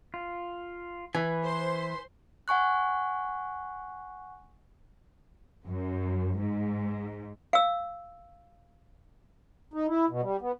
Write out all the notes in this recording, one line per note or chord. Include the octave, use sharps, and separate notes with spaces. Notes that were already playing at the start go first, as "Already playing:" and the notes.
F4
E3 B4 G#5
C5 C6
F#5 G#5 C#6 F#6
F#2
G#2
F5 E6
D#4
E4
B2
G3
B3